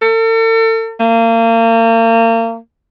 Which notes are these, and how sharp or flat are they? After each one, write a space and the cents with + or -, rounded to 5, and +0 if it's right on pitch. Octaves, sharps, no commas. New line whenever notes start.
A4 +40
A#3 -35